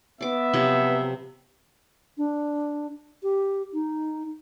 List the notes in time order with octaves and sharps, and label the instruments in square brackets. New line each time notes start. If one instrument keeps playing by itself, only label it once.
[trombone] B3 [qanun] D5 D6 [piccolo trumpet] E5
[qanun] C3 F3 F#3
[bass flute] D4
G4
D#4